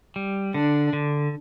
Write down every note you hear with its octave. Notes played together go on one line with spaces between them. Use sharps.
G3
D3 D4
D3